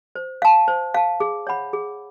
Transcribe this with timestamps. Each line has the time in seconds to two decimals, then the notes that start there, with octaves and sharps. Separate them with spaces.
0.15 C5
0.42 F5 A5
0.68 C5
0.94 F5 A5
1.20 G#4
1.47 C#5 F#5 B5
1.73 G#4